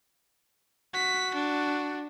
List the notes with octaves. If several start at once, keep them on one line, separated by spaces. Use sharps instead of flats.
F#4 B6
D4